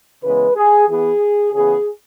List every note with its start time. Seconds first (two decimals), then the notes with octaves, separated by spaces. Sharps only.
0.23 C#3 E3 G#3 B3 B4
0.56 G#4
0.88 E3 B3 G#4
1.54 C#3 E3 B3 G#4